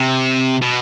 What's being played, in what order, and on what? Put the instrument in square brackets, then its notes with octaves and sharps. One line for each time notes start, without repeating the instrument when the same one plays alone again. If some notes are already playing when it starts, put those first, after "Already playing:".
Already playing: [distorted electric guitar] C3
B2